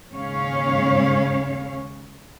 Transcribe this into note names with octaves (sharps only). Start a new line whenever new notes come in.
D#2 G#2 C#3 C#4 C#5 F5